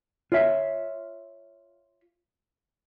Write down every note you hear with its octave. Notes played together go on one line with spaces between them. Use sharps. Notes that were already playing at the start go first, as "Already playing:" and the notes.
F4 C#5 E5